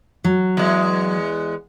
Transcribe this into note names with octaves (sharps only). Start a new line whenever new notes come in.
F#3
E2 G#3